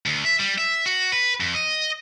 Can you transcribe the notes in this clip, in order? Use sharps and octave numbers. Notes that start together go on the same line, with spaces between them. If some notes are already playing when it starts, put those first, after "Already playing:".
D2
E5
G3
E5
F#4
B4
F2
D#5